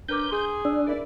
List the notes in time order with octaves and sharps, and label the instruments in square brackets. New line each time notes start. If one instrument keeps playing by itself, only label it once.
[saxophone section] C#4 A#4 B4 [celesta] D4 D6 [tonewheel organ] G6
[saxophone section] G#4 [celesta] C6
[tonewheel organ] D4 [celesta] E6
[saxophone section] E4 D5 [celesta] A#4